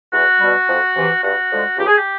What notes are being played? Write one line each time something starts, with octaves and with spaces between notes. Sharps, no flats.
E2 F#4
B2 G3
F2
C3 E3
G2 F#4
D3 F3 G#3
C#2 G4
G#4
G4